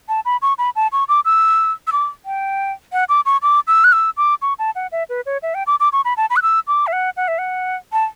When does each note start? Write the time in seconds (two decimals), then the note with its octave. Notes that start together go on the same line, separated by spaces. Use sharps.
0.09 A5
0.25 B5
0.42 C#6
0.58 B5
0.76 A5
0.92 C#6
1.09 D6
1.25 E6
1.87 E6
1.92 D6
2.26 G5
2.93 F#5
3.09 D6
3.26 C#6
3.42 D6
3.67 E6
3.84 F#6
3.93 E6
4.17 D6
4.42 C#6
4.59 A5
4.75 F#5
4.92 E5
5.09 B4
5.26 C#5
5.43 E5
5.55 G5
5.67 D6
5.80 D6
5.93 C#6
6.05 B5
6.17 A5
6.30 B5
6.36 F#6
6.42 E6
6.67 D6
6.87 E5
6.93 F#5
7.17 F#5
7.28 E5
7.38 F#5
7.93 A5